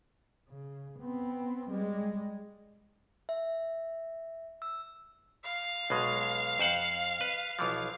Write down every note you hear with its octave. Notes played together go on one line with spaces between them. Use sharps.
C#3
B3 C4
G3 G#3
E5
E6
F5
B1 B2 G#3
F2 C5 F#5
B4
B1 E3 F3